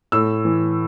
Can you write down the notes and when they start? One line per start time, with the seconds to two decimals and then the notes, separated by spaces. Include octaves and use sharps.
0.12 A2 E6
0.45 E3